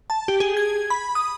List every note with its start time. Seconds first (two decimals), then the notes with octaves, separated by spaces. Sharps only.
0.10 A5
0.28 G4
0.40 G#4
0.57 G#6
0.90 B5
1.15 D#6